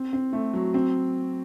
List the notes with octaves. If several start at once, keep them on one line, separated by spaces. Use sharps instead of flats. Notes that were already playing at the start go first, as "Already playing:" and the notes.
Already playing: C4
C4
A3
F#3
C4